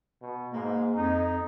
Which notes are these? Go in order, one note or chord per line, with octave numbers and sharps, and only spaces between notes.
B2
G#2 A#3
F2 D#4